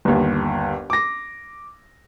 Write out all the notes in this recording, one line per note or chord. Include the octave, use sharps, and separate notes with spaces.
G1 D#2
D6 A#6